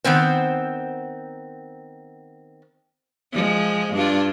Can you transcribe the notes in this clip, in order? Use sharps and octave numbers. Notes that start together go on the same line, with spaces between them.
D#3 B3 C4 C5
F3 G#3
G2 D4 F4